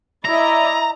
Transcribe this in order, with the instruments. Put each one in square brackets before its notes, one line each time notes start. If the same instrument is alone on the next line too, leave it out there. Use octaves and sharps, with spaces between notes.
[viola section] E4 D5 D#5 [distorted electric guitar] A#5